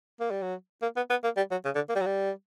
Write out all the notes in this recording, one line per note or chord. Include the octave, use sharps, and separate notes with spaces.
A#3
G3
F#3
A#3
B3
B3
A#3
G3
F#3
C#3
D3
A#3
G3
F#3
G3